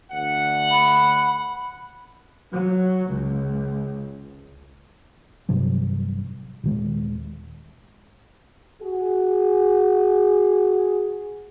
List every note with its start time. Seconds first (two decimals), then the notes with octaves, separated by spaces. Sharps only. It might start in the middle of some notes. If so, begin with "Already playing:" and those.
0.11 D2 F#5
0.71 B5
2.53 F#3
3.11 C#2
5.49 A1 G2 C3 F#3
6.64 D#1 D#3 G#3
8.82 F#4 G#4